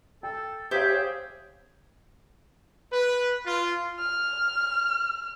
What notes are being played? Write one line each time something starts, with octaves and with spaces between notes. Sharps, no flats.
A4 G5
G4 G#4 C5 C#5 E5 F5
B4
F4
F6